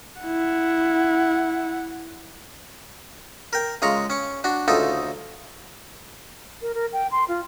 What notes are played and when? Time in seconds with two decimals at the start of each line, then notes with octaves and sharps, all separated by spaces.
0.22 E4 F#5
3.53 A#4 G5
3.82 C#3 G#3 F4 A#5 C#6
4.10 C#4 C#6
4.44 D4 F#4
4.68 D2 C#3 D#4 F4 A4
6.62 A#4
6.74 A#4
6.93 G5
7.11 C6
7.28 F4